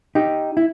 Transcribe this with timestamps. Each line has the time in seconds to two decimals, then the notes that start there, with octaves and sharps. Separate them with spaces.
0.15 D#4 G4
0.57 E4